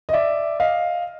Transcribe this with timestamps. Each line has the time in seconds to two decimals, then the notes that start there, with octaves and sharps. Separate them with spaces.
0.09 D#5
0.13 D5 E5
0.60 D#5 F5